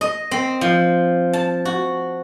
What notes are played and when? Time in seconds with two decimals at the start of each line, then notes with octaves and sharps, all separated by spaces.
0.01 D#5
0.31 C4
0.61 F3
1.33 A5
1.65 F#4